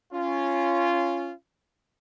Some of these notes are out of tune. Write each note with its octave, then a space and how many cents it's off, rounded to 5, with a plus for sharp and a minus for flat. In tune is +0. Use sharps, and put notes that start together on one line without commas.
C#4 +0 F4 -15